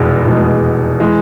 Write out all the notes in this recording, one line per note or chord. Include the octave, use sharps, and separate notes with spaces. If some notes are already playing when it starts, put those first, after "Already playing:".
Already playing: F1 E2 B2 G#3
F1 E2 B2 G#3
E3 G#3